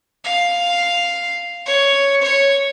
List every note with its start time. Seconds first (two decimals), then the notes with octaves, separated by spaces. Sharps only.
0.24 F5
1.66 C#5
2.22 C#5